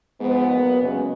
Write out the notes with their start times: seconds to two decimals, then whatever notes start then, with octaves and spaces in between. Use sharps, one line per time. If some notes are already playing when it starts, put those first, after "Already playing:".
0.19 G#2 F3 G#3 B3
0.49 A#2 F#3 A#3
0.79 F#2 C#3 G#3